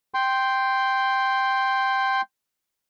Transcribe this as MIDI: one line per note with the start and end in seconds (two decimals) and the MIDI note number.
0.14 2.21 79
0.14 2.21 84